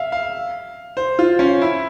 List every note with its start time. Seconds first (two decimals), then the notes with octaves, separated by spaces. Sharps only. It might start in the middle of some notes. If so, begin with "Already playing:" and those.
Already playing: E5 F5
0.12 F5
0.97 C5
1.19 F4
1.39 C#4
1.61 E4